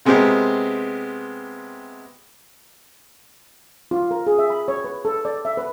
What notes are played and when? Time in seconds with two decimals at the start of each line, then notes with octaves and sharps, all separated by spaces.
0.05 C3 G#3 B3 G4 A#4 C5
3.91 F4
4.11 A#4
4.27 G#4
4.39 E5
4.50 B5
4.68 C#5
4.84 B4
5.05 A4
5.25 D5
5.45 E5
5.57 B4